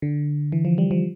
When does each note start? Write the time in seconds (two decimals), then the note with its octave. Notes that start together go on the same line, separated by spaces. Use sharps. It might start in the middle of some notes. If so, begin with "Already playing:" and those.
0.02 D3
0.52 E3
0.65 F3
0.78 G3
0.91 F3